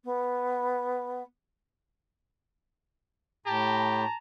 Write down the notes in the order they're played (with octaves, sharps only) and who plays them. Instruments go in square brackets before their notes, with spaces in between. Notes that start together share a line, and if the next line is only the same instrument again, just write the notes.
[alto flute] B3
[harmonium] A2 [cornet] G4 [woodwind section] A5 A#5